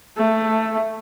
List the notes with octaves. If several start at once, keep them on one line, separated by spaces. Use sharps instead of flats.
A3